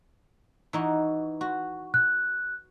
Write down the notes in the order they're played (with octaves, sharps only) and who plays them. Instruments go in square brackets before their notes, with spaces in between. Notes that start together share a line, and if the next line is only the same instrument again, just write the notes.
[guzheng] E3 D#4 F#4
F#4
[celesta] F#6